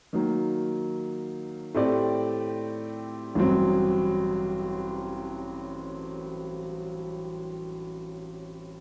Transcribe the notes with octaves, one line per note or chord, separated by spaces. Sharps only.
D#3 F#3 A#3
A2 A3 C4 G4 D5
A1 G2 F#3 C4